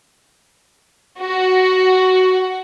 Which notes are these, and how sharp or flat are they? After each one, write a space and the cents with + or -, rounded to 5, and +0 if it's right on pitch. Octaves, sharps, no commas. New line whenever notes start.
F#4 +10